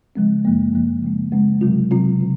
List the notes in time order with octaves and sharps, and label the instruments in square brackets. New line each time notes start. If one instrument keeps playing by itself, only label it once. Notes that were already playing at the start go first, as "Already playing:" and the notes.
[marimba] C#3 F3 G#3 C4
F#2 F3 A#3
F#2 F3 A#3
C#3 G#3 C4
C#3 G#3 C4
C3 F#3 C4 F4
C3 F#3 C4 F4
C#3